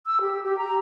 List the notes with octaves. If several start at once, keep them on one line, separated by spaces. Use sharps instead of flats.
E6
G4
G4
A#5